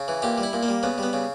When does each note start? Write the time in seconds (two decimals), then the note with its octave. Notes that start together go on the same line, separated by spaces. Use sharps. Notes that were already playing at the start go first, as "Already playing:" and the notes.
Already playing: C#3
0.08 E3
0.22 A#2 G4
0.38 G3
0.43 E4
0.53 A#2
0.63 A#3
0.68 G3
0.83 C#3 B3
0.98 G3 B3
1.13 C#3